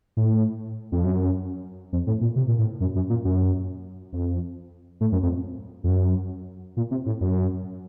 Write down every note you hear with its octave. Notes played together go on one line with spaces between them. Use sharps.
A2
F2
F#2
F2
A2
A#2
C3
A#2
A2
F#2
F#2
A#2
F#2
F2
A2
F#2
F2
F2
F#2
A#2
C3
A2
F#2